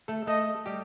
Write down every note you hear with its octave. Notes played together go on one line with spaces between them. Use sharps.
A3 A4
A3 A4 D#5
G3 G4